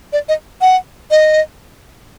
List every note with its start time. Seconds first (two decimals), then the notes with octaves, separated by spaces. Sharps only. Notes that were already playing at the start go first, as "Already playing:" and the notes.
0.13 D5
0.29 D#5
0.61 F#5
1.11 D#5